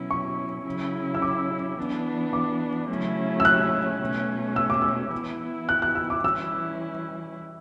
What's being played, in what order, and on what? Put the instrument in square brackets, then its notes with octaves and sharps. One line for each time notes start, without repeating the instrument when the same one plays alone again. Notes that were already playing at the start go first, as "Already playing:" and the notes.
Already playing: [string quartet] B2 F#3 C#4 E4
[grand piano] C#6
[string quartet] C#3 F#3 C#4 E4
[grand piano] E6
D6
[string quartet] E3 B3 D4
[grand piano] D6
[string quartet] C#3 F#3 A3 C#4 E4
[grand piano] E6
F#6
[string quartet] B2 A3 C#4
[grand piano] E6
D6
E6
[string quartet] E3 B3 E4
[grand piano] F#6
F#6
E6
D6
[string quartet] E3 G3 C#4 E4 [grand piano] E6